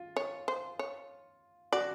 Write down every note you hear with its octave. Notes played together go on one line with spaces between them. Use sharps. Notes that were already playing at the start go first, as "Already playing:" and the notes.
Already playing: F4
C#5
C5
C#5
F#4 D5